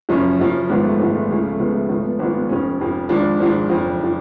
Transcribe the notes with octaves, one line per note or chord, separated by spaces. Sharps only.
F#1 F#2 F3 C#4
F#1 F#2 F3
G#1 G#2 F3 B3
A3
G#1 G#2 F3 G#3
A3
C#2 C#3 F3
A3
C#2 C#3 F3 B3
A3
G#1 G#2 F3 A3
B3
G#1 G#2 F3
B3
F1 F2 F3 C#4
F1 F2 F3
G#1 G#2 F3 D4
G#1 G#2 F3
F#1 F2 F3
F3